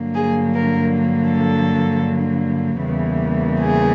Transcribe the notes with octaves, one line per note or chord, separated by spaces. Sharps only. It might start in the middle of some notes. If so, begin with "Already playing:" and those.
Already playing: G2 D3 F#3 A#3
G#4
A#4
A4
E2 C#3 E3 G3 A#3
G#4